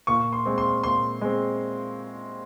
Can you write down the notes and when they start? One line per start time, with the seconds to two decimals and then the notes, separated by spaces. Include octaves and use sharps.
0.07 A#2 C#6
0.33 C6
0.45 G#3 C4
0.58 C6
0.84 A#2 C6
1.21 G#3 C4